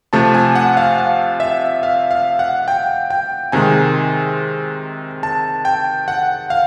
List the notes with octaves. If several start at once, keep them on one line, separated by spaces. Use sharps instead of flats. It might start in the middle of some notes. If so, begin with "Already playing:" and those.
C3 F3 A3 A5
G#5
F#5
F5
F5
E5
F5
F5
F#5
G5
G5
C3 D#3 G#3 G#5
A5
G5
F#5
F5